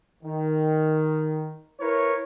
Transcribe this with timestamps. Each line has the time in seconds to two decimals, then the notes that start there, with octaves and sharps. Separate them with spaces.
0.23 D#3
1.80 E4 A#4 B4 C#5